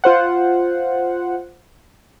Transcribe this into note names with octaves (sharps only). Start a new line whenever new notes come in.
F4 C5 F#5